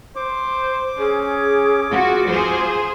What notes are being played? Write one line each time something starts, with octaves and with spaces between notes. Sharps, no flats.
C5 D6
C#4 G#4
F4 F#4
G#4 C5